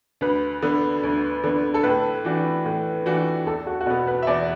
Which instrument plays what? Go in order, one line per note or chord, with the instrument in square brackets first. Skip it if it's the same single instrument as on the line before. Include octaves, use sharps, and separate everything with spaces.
[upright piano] D2 [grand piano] B4
[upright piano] D3 B3
D2
D3 B3
[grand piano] A4
[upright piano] A2 [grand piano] B4
[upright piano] E3 D4 F#4
A2
E3 D4 F#4
[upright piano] E2 [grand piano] A4
[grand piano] F#4
F#4
[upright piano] B2 B3 [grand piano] A4
[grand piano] B4
E5
[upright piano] E2 [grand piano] D5